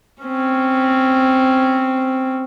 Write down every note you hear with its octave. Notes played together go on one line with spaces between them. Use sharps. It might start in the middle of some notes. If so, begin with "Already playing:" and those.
C4 C#4